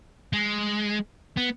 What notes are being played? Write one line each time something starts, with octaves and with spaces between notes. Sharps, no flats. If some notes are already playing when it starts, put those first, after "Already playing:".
G#3
B3